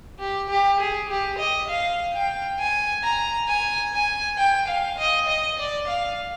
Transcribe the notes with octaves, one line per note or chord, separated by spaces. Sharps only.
G4
G4
G#4
G4
D#5
F5
G5
G#5
A#5
G#5
G#5
G5
F5
D#5
D#5
D5
F5